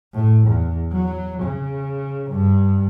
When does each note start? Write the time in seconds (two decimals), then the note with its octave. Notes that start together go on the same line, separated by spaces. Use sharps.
0.13 A2
0.48 E2
0.92 F#3
1.42 C#3
2.31 G2